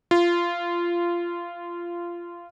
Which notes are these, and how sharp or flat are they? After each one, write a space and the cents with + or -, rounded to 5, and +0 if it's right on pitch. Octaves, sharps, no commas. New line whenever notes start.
F4 -15